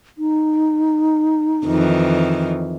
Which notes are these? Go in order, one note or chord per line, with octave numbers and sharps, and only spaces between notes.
D#4
F2 D#3 E3